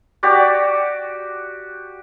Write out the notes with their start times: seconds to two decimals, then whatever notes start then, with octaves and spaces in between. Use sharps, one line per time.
0.23 F#4 G4 D5